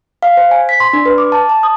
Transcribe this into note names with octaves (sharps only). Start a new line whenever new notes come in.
F5
C5
G#5
B6
C6
D4
B4
D6
A5
A5
D#6